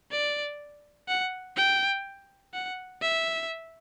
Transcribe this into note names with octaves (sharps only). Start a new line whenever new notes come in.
D5
F#5
G5
F#5
E5